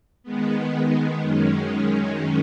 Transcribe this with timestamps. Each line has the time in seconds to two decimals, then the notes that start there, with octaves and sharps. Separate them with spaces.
0.23 D#3 G#3 B3
1.20 F#2 D#3 G#3 C#4